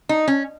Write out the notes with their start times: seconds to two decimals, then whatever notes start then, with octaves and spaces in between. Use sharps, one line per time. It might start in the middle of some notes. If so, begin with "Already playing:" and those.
0.09 D#4
0.28 C#4